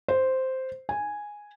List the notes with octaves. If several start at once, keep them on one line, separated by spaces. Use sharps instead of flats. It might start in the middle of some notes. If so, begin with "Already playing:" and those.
C5
G#5